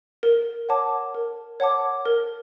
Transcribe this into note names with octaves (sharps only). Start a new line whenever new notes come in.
A#4
C#5 F#5 A5 D6
A#4
C#5 F#5 A5 D6
A#4